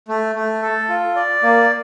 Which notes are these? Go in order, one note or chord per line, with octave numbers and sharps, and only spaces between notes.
A3
A3
A4
F4
D5
A#3